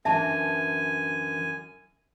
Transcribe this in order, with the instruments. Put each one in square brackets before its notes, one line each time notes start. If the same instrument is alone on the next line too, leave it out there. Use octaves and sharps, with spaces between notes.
[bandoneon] F#2 G#5 [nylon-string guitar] D3 E3 D4 [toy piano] E5 A5